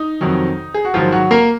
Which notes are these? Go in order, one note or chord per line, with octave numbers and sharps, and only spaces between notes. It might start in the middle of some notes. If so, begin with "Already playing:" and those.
Already playing: D#4
F2 C3 D#3 F#3
G#4
F#4
G#2 D#3 F3 F#3 F4
F#3 F#4
A#3 A#4